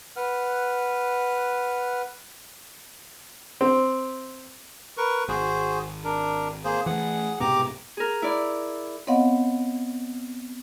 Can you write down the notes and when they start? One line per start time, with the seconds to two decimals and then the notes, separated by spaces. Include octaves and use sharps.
0.16 B4 F#5 F6
3.61 C4
4.97 A#4 B4 C#6
5.29 G#1 F#4 G#4 C5
6.04 D4 A#4
6.64 A#3 G#4 C5
6.86 E3 A3 G#4 F#5
7.40 C2 G#2 B2 G4 A#5 D6
7.97 G#4 A#4
8.22 E4 D5
9.07 B3 C4 C#5 D#5 F5 F#5